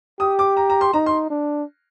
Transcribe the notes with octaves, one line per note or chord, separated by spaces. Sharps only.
G4 D#6
D6
A#5
A#5
C6
D#4 A#5
C6
D4